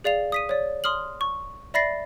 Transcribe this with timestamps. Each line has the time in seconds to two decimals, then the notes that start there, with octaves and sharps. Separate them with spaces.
0.04 G#4 D5 F5 F7
0.32 D#6 B6 D#7
0.49 C#5 D5
0.84 C6 D#6 F6 F#7
1.21 C#6
1.74 D5 E5 B5 A6 A#6 C7